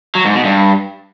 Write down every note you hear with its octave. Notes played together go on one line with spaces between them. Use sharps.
F#3
G#2
B2
G2